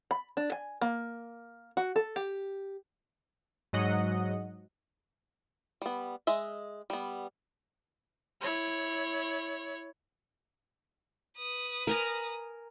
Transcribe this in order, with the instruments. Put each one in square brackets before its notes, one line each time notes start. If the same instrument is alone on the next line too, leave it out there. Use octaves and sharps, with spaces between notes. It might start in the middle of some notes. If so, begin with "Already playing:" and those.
[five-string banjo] B5
D4
G#5
A#3
F#4
A4
G4
[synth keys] G#2 F#3 D#5 F#5
[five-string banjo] G3 B3
G#3 D#5 E5
G3 B3
[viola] E4 C#5
[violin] B4 D#6
[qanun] A#4 G#5 A#5